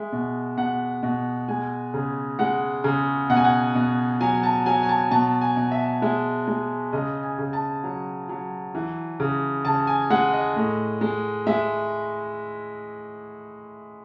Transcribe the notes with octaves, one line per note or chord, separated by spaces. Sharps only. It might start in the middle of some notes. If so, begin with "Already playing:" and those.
Already playing: G#3 E5
B2
B2 F#5
B2
G#3 G#5
C#3
G#3 F#5
C#3
B2 F#5
G#5
F#5
B2
F#3 G#5
A5
F#3 G#5
G#5
A5
B2 A5
G#5
B2
E5
G#3 E5
G#3
C#3 D#5
G#5
C#3
A5
F#3
F#3
E3
C#3
C#3 A5
G#5
G#3 F#5
D#5
A2
G#3
G#3 E5